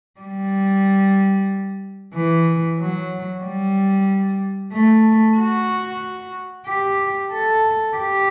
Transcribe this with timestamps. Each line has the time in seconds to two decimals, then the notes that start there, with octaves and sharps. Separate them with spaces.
0.21 G3
2.15 E3
2.79 F#3
3.44 G3
4.73 A3
5.37 F#4
6.67 G4
7.32 A4
7.97 G4